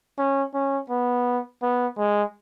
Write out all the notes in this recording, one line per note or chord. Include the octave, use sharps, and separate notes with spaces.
C#4
C#4
B3
B3
G#3